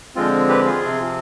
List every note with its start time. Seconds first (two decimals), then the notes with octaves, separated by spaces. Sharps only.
0.15 D3 F3 G#3 C4 F4
0.49 G4 B4
0.65 F4 G#4
0.82 C3 F3 C4